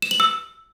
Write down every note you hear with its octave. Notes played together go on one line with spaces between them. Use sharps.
E7
F#7
E6